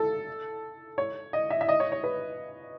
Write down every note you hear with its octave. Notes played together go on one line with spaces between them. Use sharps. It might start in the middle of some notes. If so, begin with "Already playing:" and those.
Already playing: A4
C#5
D#5
E5
E5
D#5
C#5
C#5
B4